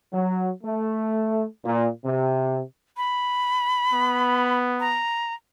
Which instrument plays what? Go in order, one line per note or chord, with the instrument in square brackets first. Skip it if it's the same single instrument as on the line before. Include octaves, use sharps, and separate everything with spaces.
[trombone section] F#3
A3
A#2
C3
[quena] B5
[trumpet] B3
[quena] A#5